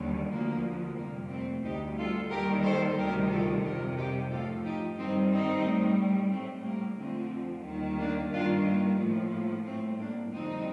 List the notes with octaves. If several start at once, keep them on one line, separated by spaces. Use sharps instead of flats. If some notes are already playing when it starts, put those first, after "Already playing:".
Already playing: D#2 D3 G3
D2 D3 F3 A#3
F2 C3 G3 A#3
A3 C4
D2 D3 G3 D#4 G4
F4 A4
D#2 D#3 G3 G4 A#4
A4 C5
D2 C3 D#3 G3 G4 A#4
F4 A4
F2 C3 G3 G4 A#4
D#4 G4
A2 F3 F4 A4
D#4 G4
G2 D#3 G3 C4 D#4
C4 D#4
A2
G3
A2 G3 A3 C4
A#3
F2 D3 F3 A3 C4
D#2 D#3 G3
A#3 D4
G2 D#3 G3 D4 F4
A#3
A2 F3 A3
A#3
A2 G3 A3 C4
A#3 D4
F2 D3 G3 C4 D#4